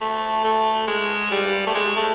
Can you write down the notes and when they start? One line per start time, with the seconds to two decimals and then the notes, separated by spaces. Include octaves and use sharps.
0.01 A3
0.44 A3
0.88 G#3
1.31 G3
1.67 A3
1.75 G#3
1.96 A3